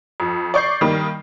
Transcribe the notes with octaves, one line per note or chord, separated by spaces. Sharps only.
F2
D5 C#6 G6 C7
D#3 G3 A#3 D#5